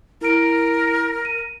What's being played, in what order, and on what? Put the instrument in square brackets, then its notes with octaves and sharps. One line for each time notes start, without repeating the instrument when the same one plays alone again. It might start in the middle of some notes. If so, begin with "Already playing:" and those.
[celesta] E4 D7 [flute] A#4
[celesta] D#7